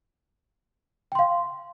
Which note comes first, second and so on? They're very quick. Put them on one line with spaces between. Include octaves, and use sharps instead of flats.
G5 C6 F5